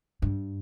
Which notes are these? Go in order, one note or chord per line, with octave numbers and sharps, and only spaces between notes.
G2